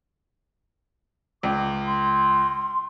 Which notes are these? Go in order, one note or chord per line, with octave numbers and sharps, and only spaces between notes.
C#2 D6
C6